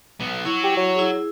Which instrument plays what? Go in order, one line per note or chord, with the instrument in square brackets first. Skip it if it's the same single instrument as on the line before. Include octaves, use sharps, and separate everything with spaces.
[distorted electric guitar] B1 B3
[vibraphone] E4 [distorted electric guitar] F#4 C#5
[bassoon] G4
F#3
[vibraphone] E4 G#4